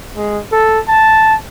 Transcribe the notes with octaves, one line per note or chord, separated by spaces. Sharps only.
G#3
A4
A5